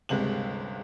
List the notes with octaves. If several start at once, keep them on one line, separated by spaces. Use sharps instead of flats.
G1 C#2 C3 G#3 F#7